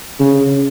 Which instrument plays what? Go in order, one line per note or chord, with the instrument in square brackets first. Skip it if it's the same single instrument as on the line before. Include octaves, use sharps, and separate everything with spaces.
[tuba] C#3